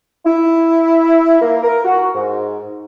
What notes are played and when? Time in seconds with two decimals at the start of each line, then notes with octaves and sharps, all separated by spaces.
0.26 E4
1.41 A#3
1.63 A#4
1.84 F#4
2.14 G#2